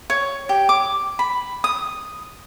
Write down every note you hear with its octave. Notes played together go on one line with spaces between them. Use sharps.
C#5
G4
D6
B5
D#6